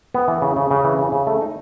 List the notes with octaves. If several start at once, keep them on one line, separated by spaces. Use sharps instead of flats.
B3
E3
C#3
C#3
C#3
E3
C#3
C#3
A3
D#4